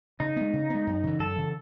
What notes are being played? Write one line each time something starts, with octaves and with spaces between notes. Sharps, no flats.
C#3 D#4
G#3 B3
C#3
G#3 B3
F#2
C#3 E3
F#2 A4
C#3 E3